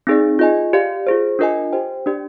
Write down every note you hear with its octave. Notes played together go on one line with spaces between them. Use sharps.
C4 D#4 G#4 D5
F4 G#4 D#5 G#5
G4 D5 F5
F4 G#4 C5
D4 F4 A#4 D#5 G#5
G4 C5 G5
D4 G4 D5